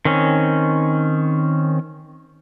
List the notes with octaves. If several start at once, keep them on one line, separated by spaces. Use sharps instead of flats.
D#3 C4 C#4